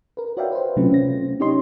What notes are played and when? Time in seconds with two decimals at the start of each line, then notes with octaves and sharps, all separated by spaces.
0.17 A#4 B4
0.37 F#4 C#5 D5 E5 F5 G5
0.52 B4 C5
0.77 C3 F#3 A3 C#4 F4
0.94 A#6
1.40 C#4 D#4 G4 C#5 D#5 C6